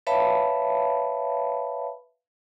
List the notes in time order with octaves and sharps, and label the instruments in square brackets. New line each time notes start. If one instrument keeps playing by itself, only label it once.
[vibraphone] B4 C#5 E5 F5 A5 B5